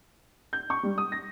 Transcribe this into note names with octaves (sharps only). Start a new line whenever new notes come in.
G6
C#6
G3
D#6
A#6